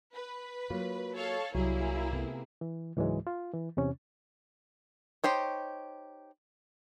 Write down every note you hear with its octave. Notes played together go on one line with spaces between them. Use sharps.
B4
F#3 A#3 F4
A4 C#5 F5
C2 F#3 G3 A#3 E4 G#4
C3 A3 B3
E3
C#2 G#2 E3 F#3 G#3
F4
E3
E2 C3 C#4
D#4 G4 C5 C#5